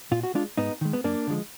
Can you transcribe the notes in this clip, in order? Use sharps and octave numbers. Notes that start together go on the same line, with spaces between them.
A#2 F4
F#4
G#3 D4 F4
G#2 B3 D#4
D#3 G#3
B3
F#2 A#3 D4
D3 F3 G#3